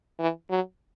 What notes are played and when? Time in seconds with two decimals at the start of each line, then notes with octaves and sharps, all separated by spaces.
0.20 E3
0.50 F#3